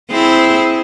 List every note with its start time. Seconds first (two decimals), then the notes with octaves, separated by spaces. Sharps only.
0.11 C4 E4 G#4